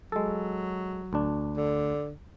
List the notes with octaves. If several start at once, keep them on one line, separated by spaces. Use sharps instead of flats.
F#3 G#3 A4
D2 D4
D3